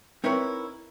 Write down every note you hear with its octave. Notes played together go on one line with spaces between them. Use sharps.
C4 D#4 E4 A#4 B4 C#5